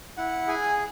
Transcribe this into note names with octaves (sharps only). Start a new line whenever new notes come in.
E4 F#5
G#4 G#5